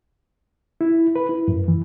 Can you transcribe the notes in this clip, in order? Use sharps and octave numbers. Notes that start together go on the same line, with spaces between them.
E4
B4
E4
F#2
E3